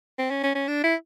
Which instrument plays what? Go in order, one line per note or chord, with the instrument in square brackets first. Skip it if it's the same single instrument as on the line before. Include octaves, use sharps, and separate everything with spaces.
[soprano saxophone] C4
C#4
C#4
C#4
D4
E4